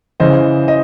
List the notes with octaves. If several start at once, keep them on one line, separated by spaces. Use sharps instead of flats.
C#3 E3 C5 D#5
D#5